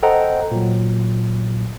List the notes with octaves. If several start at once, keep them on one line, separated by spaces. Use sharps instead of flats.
A4 C5 D#5 F#5 G5 A#5
A#2 F#3